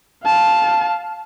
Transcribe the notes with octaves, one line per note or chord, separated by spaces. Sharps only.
F5 A5